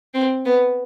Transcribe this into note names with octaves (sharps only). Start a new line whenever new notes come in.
C4
B3